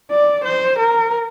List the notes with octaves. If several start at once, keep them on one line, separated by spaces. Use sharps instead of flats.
D5
C5
A#4